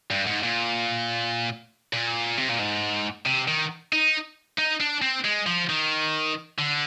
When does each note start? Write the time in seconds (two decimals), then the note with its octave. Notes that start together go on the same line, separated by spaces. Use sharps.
0.11 G2
0.26 G#2
0.43 A#2
1.93 A#2
2.38 C3
2.49 A#2
2.60 G#2
3.26 C3
3.48 D#3
3.93 D#4
4.59 D#4
4.81 D4
5.02 C4
5.24 G#3
5.47 F3
5.70 D#3
6.58 D3